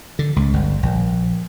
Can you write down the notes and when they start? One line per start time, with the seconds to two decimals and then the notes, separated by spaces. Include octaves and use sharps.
0.19 D3
0.36 C#2
0.54 G1
0.83 A#1